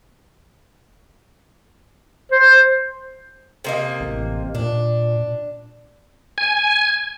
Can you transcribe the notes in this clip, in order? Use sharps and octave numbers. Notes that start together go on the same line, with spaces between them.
C5
C3 A#3 D#5
A1
A#2 D4
G#5